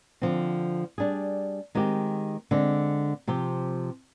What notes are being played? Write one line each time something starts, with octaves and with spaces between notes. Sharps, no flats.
D3 F3 C4
G3 D4 G#4
D#3 G#3 C4 G4
D3 G#3 C4
C3 F3 C4 G4